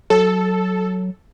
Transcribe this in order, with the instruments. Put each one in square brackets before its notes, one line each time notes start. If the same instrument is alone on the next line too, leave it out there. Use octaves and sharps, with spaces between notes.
[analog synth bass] F#3 [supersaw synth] A4